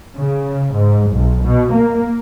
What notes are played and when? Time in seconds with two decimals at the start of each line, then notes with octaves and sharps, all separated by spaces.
0.16 C#3
0.74 G#2
1.11 B1
1.44 B2
1.74 A#3